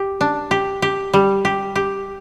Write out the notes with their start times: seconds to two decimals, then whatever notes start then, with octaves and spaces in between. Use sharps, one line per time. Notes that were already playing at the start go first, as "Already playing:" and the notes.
Already playing: G4
0.21 D4
0.51 G4
0.82 G4
1.13 G3
1.45 G4
1.76 G4